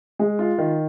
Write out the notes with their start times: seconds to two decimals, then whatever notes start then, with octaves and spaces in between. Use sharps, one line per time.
0.19 G#3
0.39 F4
0.58 D#3